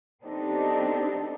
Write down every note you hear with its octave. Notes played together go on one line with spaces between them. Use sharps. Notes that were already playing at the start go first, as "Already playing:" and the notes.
B3 C4 D4 D#4 G4 A4